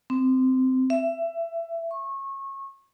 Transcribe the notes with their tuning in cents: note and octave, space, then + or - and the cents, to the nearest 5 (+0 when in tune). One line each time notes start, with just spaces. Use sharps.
C4 -15
E5 +20
C#6 -25